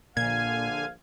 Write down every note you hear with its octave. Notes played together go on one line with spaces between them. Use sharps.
A#1 A#2 D3 F5 G#5 G#6